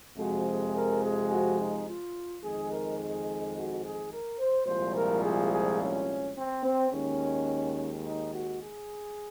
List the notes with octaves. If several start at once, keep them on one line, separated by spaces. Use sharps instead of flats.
F2 C3 F3 G#3 F#4
G#4
A#4
G#4
F#4
D#4
F4
F2 D#3 G#3 G#4
A#4
G#4
F#4
G#4
A#4
C5
C2 A#2 F3 G#3 C5
A#4
G#4
G#4
C#4
C4
C4
D#2 D#3 G#3 C#4
D#4
F#4
G#4